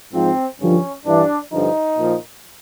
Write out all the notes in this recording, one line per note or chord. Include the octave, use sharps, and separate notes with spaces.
G#2 F3 C4
G2 D3 F3 C#4
G2 E3 D4
G2 D3 F3 D#4
A#2 F3